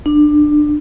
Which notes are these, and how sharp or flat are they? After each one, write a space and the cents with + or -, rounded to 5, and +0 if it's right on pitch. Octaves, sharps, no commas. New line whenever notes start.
D4 +20